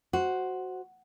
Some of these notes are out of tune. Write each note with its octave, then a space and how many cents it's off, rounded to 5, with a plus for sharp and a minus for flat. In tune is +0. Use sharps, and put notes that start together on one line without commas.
F#4 +0 C5 +0